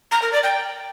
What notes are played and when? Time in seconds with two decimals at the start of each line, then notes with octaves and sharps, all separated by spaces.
0.11 A#5
0.21 A#4
0.32 D5
0.42 G5